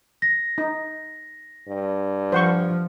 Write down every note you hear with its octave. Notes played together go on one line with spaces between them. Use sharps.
A#6
D#4
G2
F3 C5 F#5 C#6